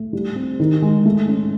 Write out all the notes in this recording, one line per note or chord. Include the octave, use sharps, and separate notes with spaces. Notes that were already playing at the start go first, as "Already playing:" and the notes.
Already playing: A3
G3
C4
D#3
G#3
A3
C#4